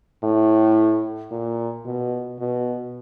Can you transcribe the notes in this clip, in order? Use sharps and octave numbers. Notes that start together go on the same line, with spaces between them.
A2
A#2
B2
B2